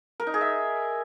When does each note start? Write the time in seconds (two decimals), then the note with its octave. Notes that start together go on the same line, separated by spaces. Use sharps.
0.20 A#4
0.27 D#4
0.34 G#4
0.41 E5